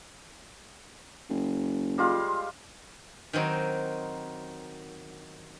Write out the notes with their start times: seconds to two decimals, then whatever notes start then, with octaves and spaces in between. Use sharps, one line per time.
1.30 F#1
1.98 G3 G#3 F4
3.33 D#3 F#3 C4 D#4